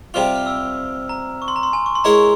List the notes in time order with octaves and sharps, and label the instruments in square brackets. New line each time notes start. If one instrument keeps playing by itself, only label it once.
[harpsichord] C3 G3 C4 F4 [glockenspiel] F6
[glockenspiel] F6
E6
A#5
C#6
C6
A#5
C6
G#5
C#6
C6
[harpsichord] G#3 E4 A#4 C#5 [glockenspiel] A#5